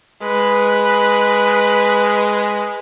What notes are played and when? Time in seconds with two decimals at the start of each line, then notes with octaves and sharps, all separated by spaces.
0.23 G#3 B4